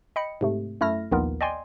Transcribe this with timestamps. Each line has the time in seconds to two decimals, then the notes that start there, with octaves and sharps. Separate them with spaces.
0.16 D#5 G5 B5 C#7
0.41 G#2 C3 A3
0.81 F#2 A3 E4 F6 A#6
1.11 A#1 D#2 D#3 B3 F4 A#4
1.41 D5 D#5 G5 G#5 C6